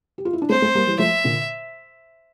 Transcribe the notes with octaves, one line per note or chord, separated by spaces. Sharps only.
G4
F4
E4
D4
A3 C4 C5
A3 C4
G3 A#3
E3 G3
F3 A3 E5
A#2 D3